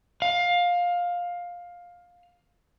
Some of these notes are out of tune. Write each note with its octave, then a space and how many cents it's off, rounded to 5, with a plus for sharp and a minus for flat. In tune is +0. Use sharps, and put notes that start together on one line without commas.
F5 +15